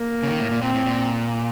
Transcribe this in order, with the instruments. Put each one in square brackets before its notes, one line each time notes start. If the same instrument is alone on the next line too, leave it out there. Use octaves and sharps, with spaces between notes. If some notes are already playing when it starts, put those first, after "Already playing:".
Already playing: [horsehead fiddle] A#3
[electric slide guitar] C#3
D#3
A2
A#2
[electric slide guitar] A#2 [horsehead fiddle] C4
[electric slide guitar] A2
A#2